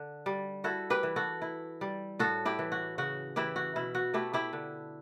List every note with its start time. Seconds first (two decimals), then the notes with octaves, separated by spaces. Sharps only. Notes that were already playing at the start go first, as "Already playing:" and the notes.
Already playing: D3
0.26 G3
0.64 E4 F#4 A4
0.90 G4 B4
1.03 E3
1.16 F#4 A4
1.42 E4
1.81 G3
2.19 A2 F#4 A4
2.45 E4 G4
2.59 E3
2.72 F#4
2.98 C#3 F#4
3.36 E3 E4 G4
3.56 F#4
3.76 B2 E4
3.95 F#4
4.14 A3 E4 G4
4.33 E4 G4
4.53 D3